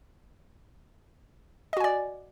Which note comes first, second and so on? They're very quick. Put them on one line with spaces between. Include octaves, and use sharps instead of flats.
D#5 F#4 G#5 D5